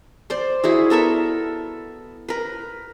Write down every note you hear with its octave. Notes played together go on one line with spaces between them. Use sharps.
C5 D5 C6
E4 F#4 G#4
B3 A4 A#4 E5
A#4 B4